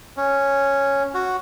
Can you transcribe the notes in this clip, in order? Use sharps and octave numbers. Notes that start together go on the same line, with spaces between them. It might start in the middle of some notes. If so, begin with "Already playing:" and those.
C#4
F#4